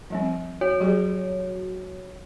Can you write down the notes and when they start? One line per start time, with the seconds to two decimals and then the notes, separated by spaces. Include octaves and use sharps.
0.10 F3 G3 C4
0.61 F#4 C#5
0.80 F#3 G4 G#4